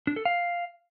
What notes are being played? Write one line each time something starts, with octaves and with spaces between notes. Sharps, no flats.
D4
A4
F5